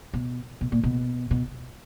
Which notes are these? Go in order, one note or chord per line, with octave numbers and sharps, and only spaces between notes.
B2
B2
A#2
B2
B2